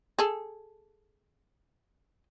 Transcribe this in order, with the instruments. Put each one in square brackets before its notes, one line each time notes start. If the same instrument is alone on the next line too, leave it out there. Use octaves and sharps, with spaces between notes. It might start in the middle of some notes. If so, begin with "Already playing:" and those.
[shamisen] G#4 A4